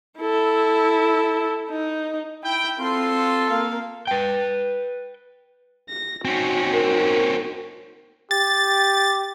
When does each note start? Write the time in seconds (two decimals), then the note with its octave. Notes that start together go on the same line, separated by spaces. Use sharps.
0.19 E4 A4
1.70 D#4
2.43 E4 G5
2.79 C4 F4 A4 C6
3.50 A#3 F5
4.07 B4 G5
5.89 A#6
6.25 C4 C#4 D#4 F#4
6.73 A#4
8.31 G4 A6